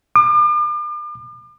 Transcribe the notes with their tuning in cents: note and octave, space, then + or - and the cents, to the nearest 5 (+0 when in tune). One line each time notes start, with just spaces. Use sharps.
D6 +40